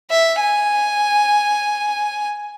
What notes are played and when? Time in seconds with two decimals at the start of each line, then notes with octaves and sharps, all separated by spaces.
0.11 E5
0.40 G#5